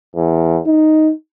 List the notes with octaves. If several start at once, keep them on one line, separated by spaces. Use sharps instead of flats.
E2
D#4